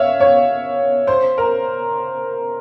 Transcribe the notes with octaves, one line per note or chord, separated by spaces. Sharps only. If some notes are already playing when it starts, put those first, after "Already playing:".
Already playing: C#5 E5 F5
C#5
C5
A#4